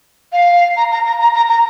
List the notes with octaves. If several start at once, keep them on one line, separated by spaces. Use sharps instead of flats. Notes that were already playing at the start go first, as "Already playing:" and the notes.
F5
A#5
A#5
A#5
A#5
A#5
A#5